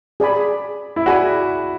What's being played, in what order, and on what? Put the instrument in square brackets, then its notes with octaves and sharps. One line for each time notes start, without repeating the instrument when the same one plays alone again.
[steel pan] G#4 D5 G#5 B5
[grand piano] E4
[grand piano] F#4 [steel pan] G#4 D5 G#5 B5